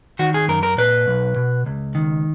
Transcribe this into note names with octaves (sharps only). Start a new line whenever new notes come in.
D#3 F#4
G#4
F#2 A#4
A#4
A#2 B4
B1
B2
C#2
D#3